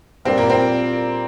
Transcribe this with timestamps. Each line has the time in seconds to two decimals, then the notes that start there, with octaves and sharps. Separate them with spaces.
0.25 A#2 G3 C4 D4 F4 A#4
0.38 A#3
0.50 C4